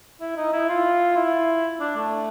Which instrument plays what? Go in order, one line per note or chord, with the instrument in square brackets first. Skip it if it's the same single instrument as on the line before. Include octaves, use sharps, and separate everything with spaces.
[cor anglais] E4
D#4
E4
F4
E4
D4
A3